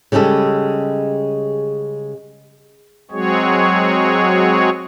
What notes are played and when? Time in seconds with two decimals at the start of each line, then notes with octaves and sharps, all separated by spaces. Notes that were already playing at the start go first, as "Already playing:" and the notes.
0.12 C#3 G3 G#3 G4 A4
3.11 F#3 G#3 C4 F#4 G#4 C#5